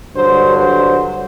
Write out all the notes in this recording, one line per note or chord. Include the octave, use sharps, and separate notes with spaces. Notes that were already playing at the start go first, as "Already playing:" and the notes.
G2 D3 F#3 C5
C5